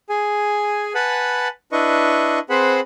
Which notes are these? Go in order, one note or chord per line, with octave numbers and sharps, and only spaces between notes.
G#4 G#5
B4 F#5 G#5 A5 B5
D4 E4 B4 D#5 C#6
C4 G#4 B4 C5 F#5 B5